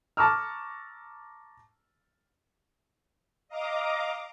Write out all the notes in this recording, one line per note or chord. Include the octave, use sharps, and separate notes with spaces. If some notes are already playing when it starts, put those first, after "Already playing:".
A5 A#5 C#6 D6 E6 F6
D#5 F5 A#5 D6